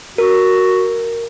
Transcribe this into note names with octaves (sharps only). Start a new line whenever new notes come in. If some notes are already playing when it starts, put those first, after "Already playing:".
F#4 A#4